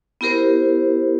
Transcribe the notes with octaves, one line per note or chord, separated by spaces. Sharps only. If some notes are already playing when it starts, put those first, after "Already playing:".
B3 E4 G4 A#4 C5